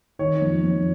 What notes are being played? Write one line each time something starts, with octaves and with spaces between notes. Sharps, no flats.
D#3 C#5
F2
F2